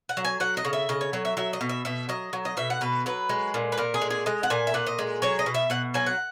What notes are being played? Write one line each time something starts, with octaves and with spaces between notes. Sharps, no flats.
F#5
F#3
G#5
F#3 F#5
D#5
C#3
E5
C#3 D#5
C#5
F#3 C#5
E5
F#3 E5
D#5
B2
E5
B2 E5
F#3 D#5
F#3
D#5
B2 E5
F#5
B2 B4
F#3 B4
G#3
A#2
B4
A#2 A#4
G#4
G#3
G#4
G#3 D#5
F#5
A#2 G#5
E5
A#2 F#5
D#5
G#3
F#3 C#5
D#5
B2
E5
B2 F#5
F#3 G#5
F#5